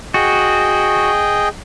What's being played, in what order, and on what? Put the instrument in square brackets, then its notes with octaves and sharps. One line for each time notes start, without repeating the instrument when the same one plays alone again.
[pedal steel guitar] F#4 [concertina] G#4 D#5 G5